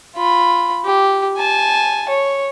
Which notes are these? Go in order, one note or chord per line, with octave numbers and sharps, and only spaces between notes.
F4 B5
G4
G#5 A5
C#5